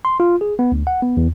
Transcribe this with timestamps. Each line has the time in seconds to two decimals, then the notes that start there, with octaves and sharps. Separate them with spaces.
0.05 C6
0.20 F4
0.41 G#4
0.59 B3
0.72 D2
0.87 F#5
1.02 B3
1.17 E2